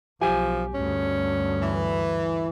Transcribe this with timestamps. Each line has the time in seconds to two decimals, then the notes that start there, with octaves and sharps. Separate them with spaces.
0.21 B1 F3 G4 G#5
0.74 D2 G2 C#4
1.62 E3